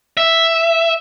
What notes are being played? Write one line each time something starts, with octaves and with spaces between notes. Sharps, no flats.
E5